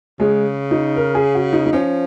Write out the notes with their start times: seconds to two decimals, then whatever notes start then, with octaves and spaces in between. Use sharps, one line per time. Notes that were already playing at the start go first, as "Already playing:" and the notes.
0.19 C#3 G#3
0.71 D#4
0.96 A#4
1.15 G#4
1.35 F#4
1.53 D#4
1.66 D#4
1.72 F3 C#4